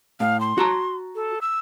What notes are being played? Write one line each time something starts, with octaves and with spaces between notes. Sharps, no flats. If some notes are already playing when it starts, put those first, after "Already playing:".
A2 F5
C6
F#4 A5 A#5
A4
E6